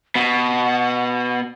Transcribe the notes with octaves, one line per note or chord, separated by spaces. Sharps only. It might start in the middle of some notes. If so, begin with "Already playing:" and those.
B2 F#5